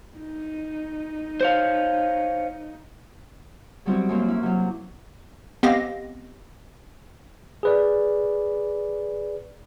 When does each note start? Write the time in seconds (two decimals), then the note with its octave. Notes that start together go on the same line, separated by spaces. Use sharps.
0.17 D#4
1.41 C5 C#5 F5
3.85 F#3 G3 B3 C4 E4 F#4
4.09 F#2 F#3 A#3 C4
4.28 C#4 E4
4.43 C3 F#3
5.63 B3 C4 G4 D#5 F5 A#6
7.63 G#4 B4 D5